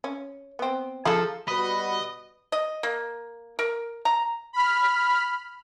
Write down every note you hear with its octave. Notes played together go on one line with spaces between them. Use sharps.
C#4
B3 C4
F3 G#4 A4 F5 A#5
G3 B3 F#4 B4 D#5 B5
D#5
A#3
A#4
A#5
B5 F6